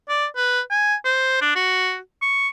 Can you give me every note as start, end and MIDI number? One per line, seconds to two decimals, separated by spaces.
0.09 0.26 74
0.36 0.60 71
0.70 0.95 80
1.05 1.40 72
1.41 1.53 62
1.55 1.98 66
2.22 2.48 85